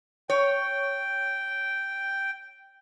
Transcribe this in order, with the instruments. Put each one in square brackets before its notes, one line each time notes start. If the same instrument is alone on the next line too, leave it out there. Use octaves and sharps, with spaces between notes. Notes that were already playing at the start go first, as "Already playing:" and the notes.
[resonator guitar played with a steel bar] C#5 [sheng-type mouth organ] G5